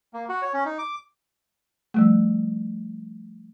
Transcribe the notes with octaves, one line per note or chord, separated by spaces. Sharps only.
A#3
F#4
C#5
C#4
D#4
D6
F3 G3 A3